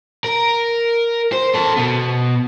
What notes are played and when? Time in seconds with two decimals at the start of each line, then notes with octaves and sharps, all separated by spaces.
0.25 A#4
1.32 C5
1.54 A4 C5
1.76 B2 B3